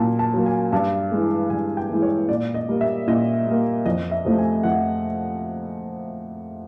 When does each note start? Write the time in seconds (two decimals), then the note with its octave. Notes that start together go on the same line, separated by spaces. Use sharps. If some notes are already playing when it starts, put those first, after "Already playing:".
Already playing: A#2 F#3 A#3 A5
0.19 A5
0.33 F#3 A#3
0.46 G#5
0.72 G2 A5
1.12 E3 G#3
1.50 G2 G#5
1.77 G5
1.89 E3 G#3
2.02 C#5
2.29 A#2 D5
2.54 D#5
2.69 G3 A#3
2.81 E5
3.07 A#2 D#5
3.46 G3 A#3
3.86 F2 D#5
4.11 E5
4.25 C3 F3 A3
4.38 G#5
4.63 F2 F#5